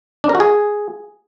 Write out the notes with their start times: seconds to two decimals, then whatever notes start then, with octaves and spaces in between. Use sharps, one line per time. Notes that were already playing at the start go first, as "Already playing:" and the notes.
0.24 D4
0.29 A#4
0.35 F#4
0.40 G#4